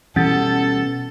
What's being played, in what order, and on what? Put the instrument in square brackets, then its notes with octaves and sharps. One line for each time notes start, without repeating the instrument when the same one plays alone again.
[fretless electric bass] B2 G3 [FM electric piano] E3 A6 [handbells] C#4 [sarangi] A4